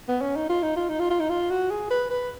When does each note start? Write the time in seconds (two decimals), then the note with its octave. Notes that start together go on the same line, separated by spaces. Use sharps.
0.09 B3
0.22 C#4
0.36 D#4
0.50 F4
0.63 D#4
0.76 F4
0.89 D#4
1.00 F4
1.10 F4
1.20 D#4
1.30 F4
1.50 F#4
1.70 G#4
1.90 B4
2.10 B4